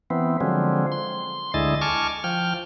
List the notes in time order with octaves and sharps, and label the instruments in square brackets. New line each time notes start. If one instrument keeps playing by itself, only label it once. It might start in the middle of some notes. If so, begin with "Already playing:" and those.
[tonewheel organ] E3 B3 C4
D3 F3 F#3 G#3 C4
C6
D2 D3 G#3 E4 D#5 A6
G#5 A5 C#6 D6 F6
F3 G5 F6